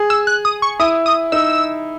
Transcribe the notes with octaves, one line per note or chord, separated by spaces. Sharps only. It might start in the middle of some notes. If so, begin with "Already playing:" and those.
Already playing: G#4
E6
F#6
D#6
C#6
E4 D#6
D#6
D#4 E6